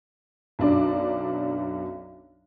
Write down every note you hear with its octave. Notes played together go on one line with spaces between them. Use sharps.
B1 F#2 F#3 D4 D5 D6